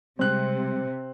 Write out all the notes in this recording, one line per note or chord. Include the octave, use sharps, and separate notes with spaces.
C3 G3 G#3 C4 F#6